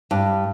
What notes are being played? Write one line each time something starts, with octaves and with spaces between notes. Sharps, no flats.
G2